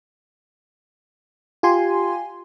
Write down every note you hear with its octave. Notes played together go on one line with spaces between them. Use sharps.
F4 G4 G#5 C6